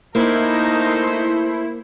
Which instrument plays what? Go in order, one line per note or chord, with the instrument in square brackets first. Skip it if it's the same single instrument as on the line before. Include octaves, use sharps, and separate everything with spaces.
[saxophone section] A3 C5 [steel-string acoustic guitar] A#3 [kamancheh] D#4 A#4 [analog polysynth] E4